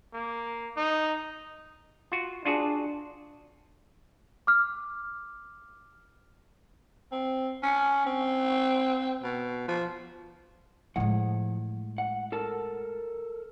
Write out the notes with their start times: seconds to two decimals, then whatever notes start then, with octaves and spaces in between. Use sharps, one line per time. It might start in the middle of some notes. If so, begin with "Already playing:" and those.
0.13 A#3
0.77 D#4
2.12 F4 F#4
2.45 D4 F4 F#4 G#4
4.47 D6 F6
7.12 C4
7.63 C#4
8.06 C4
9.23 B2
9.68 F3
10.96 A2 F3 G#3 F#5
11.98 F#5
12.32 A4 A#4 A5